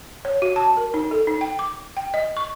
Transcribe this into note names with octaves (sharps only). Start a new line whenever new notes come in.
C#5
F#4
A5
A#4
D#4
A4
D#4
G5
D6
G5
D#5
C#6